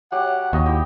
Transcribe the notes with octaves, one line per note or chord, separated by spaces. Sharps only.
F#3 G4 D5 F#5
D#2 F#4 D#5
E4 G4 G5